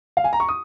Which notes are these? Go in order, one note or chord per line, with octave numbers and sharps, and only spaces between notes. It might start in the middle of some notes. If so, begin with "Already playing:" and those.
F5
G#5
A#5
C#6
D#6